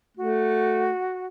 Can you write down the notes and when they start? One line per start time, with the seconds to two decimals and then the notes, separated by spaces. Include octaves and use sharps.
0.17 A3 F#4